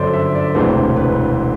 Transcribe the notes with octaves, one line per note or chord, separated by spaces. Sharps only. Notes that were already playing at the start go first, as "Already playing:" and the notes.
Already playing: G1 F#2 D3 A4 C5 D5
E5
D5
E1 D2 C3 E3 C5
B4